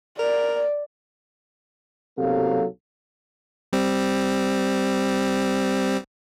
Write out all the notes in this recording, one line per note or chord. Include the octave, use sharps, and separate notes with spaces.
A#4 D5
B1 C3 F#3 A#3 A4 F5
G3 C4